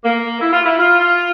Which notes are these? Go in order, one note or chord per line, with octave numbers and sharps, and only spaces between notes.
A#3
E4
F4
E4
F4